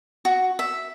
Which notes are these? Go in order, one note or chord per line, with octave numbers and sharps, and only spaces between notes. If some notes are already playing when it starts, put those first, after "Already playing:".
F#4
E5